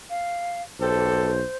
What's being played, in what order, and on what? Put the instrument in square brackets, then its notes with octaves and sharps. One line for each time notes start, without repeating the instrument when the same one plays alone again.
[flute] F5
[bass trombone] B1 [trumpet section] G4 A4 [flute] C5